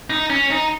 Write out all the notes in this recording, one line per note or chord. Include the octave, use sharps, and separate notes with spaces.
D#4
C#4
D#4